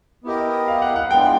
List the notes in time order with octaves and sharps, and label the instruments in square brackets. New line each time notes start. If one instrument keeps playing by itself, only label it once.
[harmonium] B3 E4 G4 A#4 D#5
[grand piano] F5
F#5
F#5
[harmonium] E3 G#3 B3 D4 F4 [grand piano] G5